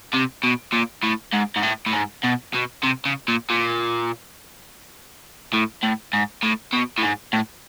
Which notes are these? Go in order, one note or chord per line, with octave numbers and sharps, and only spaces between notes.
C3
B2
A#2
A2
G#2
G#2
A2
A2
G#2
B2
B2
C3
C#3
A#2
A#2
A2
A2
G#2
A2
B2
A2
G#2
A2